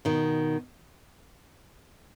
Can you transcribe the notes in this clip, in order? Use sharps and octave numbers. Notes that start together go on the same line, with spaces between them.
B2 D#3